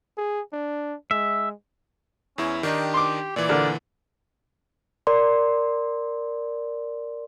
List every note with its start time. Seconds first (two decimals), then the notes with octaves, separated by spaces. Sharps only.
0.17 G#4
0.52 D4
1.11 G#3 E5
2.38 E2 C#4 E4
2.63 D#3 D4 D#4 G4
2.94 C6 D6
3.36 A#2 E3 D5
3.49 D3 A#4
5.07 A#4 D5 C6